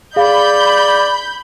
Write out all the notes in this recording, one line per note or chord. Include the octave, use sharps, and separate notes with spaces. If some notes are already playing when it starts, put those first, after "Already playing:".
G#4 D5 F5 B5 G6